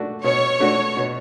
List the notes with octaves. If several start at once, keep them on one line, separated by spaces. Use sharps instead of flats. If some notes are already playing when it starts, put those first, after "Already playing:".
Already playing: A3 D4 F#4
B2 C#5
A3 D4 F#4
B2